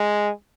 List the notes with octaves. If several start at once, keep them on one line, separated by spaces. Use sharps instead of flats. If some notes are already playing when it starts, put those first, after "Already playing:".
Already playing: G#3